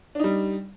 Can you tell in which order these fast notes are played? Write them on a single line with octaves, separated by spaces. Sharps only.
D4 D#4 G3